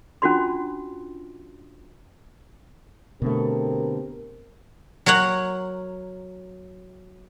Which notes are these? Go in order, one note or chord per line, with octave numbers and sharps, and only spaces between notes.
C#4 D4 F4 F#4 D5 C6
B2 D3 A3 C4 G4 A#4
F#3 A#4 C#5 F#5